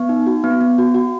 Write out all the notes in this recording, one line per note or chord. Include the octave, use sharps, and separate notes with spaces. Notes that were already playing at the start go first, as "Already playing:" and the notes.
Already playing: B3
D#4
F#4
B3
B3
F#4
F#4